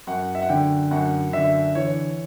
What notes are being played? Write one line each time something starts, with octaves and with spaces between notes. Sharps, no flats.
F#2 F#5
E5
F#5
D3 G5
F#2 F#5
D3 E5
E3 C#5